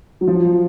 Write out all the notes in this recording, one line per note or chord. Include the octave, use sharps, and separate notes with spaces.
F#3
F3